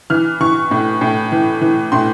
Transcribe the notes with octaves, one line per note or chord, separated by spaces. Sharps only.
E3 F6
E3 C#6
A2
A2
E3
E3
A2 C6